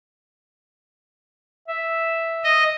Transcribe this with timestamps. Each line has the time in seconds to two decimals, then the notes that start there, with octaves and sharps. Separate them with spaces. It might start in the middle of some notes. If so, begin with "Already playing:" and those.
1.68 E5
2.44 D#5